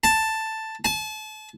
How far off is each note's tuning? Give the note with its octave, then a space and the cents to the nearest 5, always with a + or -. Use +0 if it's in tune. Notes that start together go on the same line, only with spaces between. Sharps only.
A5 +5
A5 -35